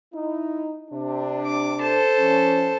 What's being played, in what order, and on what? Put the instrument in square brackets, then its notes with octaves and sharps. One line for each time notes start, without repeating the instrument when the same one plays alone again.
[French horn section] D#4 E4
C3 D4
[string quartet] D6
A4 C5 A5
[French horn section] F3 C#4